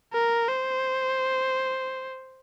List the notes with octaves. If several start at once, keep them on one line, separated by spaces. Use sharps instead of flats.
A#4
C5